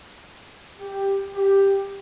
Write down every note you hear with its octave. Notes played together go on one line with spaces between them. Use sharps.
G4
G4